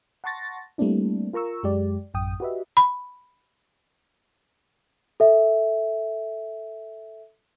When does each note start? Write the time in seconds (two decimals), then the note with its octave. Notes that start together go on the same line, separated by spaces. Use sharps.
0.24 F#5 A5 C6 C#6 A6 A#6
0.78 G3 A3 A#3 C4 D4 E4
1.33 F4 A#4 A#5 C#6 E6
1.63 F#2 G#3 G4 D5
2.14 A1 F#2 G5 D#6
2.40 F#4 G4 B4 D#5 E5
2.77 B5
5.20 A4 E5